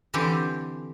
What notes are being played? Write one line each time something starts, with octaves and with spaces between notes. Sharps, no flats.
D3 E3 C4 G4